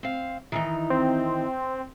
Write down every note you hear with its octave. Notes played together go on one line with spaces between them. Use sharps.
C4 F5
D#3 E3 D#4
C4